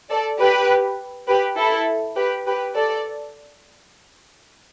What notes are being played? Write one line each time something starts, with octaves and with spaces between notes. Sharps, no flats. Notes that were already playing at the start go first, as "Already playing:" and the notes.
A4 D5
G4 B4
G4 B4
E4 A4
G4 B4
G4 B4
A4 D5